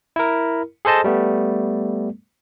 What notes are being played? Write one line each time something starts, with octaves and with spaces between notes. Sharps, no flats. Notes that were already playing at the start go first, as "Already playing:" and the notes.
E4 A#4
G#4 A4 C5 D#5 A5
G3 A3 B3